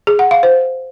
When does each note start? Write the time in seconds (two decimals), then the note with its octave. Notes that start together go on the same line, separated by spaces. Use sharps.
0.07 G#4
0.19 F#5
0.31 F5
0.43 C5